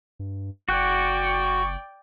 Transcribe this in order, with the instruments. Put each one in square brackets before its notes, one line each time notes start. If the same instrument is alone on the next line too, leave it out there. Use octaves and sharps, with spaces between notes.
[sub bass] G2
[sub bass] F#1 [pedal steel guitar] F#4 F#6 [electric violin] D5 G5 [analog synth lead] C#6